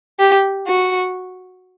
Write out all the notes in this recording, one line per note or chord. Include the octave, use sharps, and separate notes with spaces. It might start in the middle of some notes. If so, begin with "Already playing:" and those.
G4
F#4